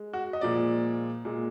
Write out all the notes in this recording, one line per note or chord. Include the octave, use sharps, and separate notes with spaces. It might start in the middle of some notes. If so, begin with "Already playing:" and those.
Already playing: G#3
F#4
D#5
A#2 F3 G#3 D5
A#2 G#3